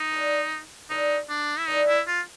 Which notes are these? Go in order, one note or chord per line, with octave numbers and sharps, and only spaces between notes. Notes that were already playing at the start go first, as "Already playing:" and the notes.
Already playing: D#4
E3 A3 D4
E3 A3 D4 D#4
D4
E4
E3 A3 D4 D#4
E4
F4